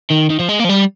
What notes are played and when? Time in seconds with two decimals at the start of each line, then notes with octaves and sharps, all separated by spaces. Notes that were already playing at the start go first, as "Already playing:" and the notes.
0.11 D#3
0.30 D#3
0.40 F3
0.49 G#3
0.60 A#3
0.64 F3
0.69 G3